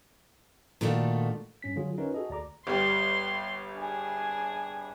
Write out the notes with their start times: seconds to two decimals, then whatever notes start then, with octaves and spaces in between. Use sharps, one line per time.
0.81 A#2 D#3 A3 D4 F4 F#4
1.62 G2 C#4 B6
1.76 D3 F#3 F4 G#4
1.98 C#4 D#4 F4 A#4 B4 C#5
2.14 F#4 G#4 A4 D#5
2.30 D2 D5 A#5 D6
2.67 G1 G3 G4 C6
3.76 D4 G#4